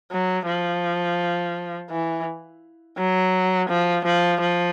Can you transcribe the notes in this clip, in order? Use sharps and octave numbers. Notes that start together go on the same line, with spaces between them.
F#3
F3
E3
F#3
F3
F3
F3